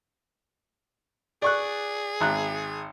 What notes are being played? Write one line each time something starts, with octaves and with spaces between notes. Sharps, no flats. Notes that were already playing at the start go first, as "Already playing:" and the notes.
G#4 D5 C#6 F#6
G#1 A#5 F#6